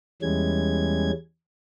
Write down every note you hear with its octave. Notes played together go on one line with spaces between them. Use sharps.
E2 E3 G3 G#3 C#4 G#6